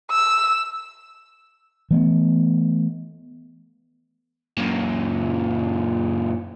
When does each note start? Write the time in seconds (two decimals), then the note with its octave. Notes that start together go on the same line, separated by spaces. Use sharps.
0.11 E6
1.91 E3 A3 B3
4.57 F#2 A#2